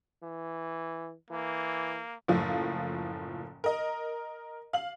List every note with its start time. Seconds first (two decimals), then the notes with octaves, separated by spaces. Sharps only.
0.23 E3
1.31 E3 A#3
2.28 F#1 A2 F3 F5
3.64 A#4 D#5
4.73 F5 F#7